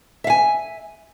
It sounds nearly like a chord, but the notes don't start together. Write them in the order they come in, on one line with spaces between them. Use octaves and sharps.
E5 F5 G#5